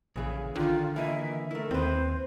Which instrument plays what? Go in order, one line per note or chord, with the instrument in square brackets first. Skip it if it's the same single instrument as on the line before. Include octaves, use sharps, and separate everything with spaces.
[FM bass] A#1 [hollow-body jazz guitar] C#3 E3 G#4
[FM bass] D3 [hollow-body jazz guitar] D#3 [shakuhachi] F4
[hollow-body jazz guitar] E3 A#3 D#5 [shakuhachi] E5
[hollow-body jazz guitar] A3 E4 [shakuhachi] A#4
[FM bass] D#2 [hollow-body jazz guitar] C4 B4 [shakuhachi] C5